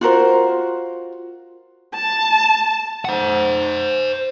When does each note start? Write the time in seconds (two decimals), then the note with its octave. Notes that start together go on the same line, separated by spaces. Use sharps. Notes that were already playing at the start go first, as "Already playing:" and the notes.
0.01 F4 F#4 A#4 C5
1.95 A5
3.05 C5 F#5